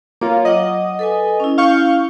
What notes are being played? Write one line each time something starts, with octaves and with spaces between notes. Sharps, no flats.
A#3 F4 C#5
F#3 D#5 F#5 D6
A4 B4 G#5
C#4 E4
F5 C#6 G6